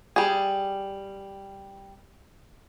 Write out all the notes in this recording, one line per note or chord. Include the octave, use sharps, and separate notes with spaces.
G3 G#4